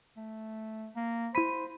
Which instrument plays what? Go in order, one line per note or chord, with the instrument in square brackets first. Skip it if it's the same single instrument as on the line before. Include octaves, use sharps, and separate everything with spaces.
[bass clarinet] A3
A#3
[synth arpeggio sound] E4 B6 [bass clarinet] C5 [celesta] B5 D#7